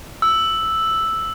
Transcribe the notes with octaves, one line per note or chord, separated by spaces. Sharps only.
E6